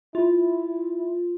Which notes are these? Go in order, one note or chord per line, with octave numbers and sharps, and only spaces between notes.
E4 F4